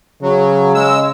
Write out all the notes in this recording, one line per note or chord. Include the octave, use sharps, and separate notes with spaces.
C#3 F#3
G#3 E6